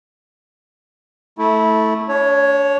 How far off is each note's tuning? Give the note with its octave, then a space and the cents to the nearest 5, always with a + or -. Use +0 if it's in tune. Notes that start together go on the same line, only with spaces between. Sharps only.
A3 +0 E4 -20
D4 -45 C#5 +0